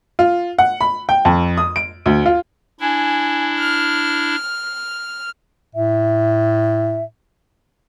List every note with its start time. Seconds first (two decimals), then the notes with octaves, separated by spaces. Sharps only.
0.19 F4
0.59 F#5
0.81 B5
1.09 G5
1.25 F2
1.57 D#6
1.76 D7
2.06 D2
2.26 F4
2.80 D4 E4 G#5
3.59 F6
5.75 A2 E5